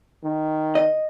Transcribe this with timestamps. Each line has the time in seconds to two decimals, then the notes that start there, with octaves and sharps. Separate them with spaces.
0.23 D#3
0.75 D#5